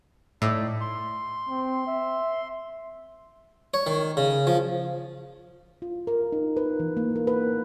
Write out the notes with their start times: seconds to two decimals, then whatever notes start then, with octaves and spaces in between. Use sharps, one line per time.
0.42 A2 D#4 D5 E5
0.81 C6
1.49 C4
1.87 E5
3.74 C#5
3.87 D#3
4.17 C#3
4.47 F3
5.82 F4
6.07 A#4
6.32 D#4
6.57 B4
6.80 E3
6.97 A#3
7.16 A#4
7.27 B4